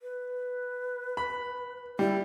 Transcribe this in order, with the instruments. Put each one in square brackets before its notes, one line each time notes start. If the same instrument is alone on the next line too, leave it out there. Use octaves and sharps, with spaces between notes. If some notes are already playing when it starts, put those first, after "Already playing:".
[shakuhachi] B4
[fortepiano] B5
[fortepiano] G3 [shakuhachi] E4